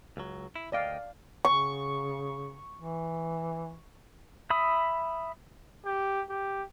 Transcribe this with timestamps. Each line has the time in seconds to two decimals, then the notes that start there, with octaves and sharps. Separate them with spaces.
0.17 C#2 F#3
0.56 E4
0.72 D2 D5 D#5 F5 G5
1.45 C#3 C#6
2.76 E3
4.50 E5 B5 D#6
5.85 G4
6.30 G4